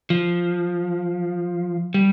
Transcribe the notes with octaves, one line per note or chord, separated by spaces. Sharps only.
F3
G3